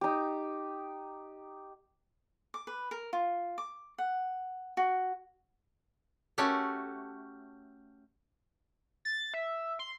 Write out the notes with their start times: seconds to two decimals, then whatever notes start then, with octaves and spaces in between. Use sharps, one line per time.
0.01 D#4 G4
2.54 D6
2.67 B4
2.91 A#4
3.13 F4
3.58 D6
3.98 F#5
4.77 F#4
6.38 A3 C#4 F#4 G4 A4
9.05 A6
9.34 E5
9.79 C6